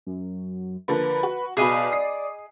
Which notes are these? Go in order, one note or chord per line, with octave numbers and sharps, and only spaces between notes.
F#2
D3 F3 A#3 B4
F#4
B1 B2 G#4 D5 D#5 B5
D#6 C7